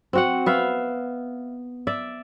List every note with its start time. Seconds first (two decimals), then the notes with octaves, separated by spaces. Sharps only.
0.13 C4 F#4 F#5
0.46 B3 E5 F5
1.87 D5 E5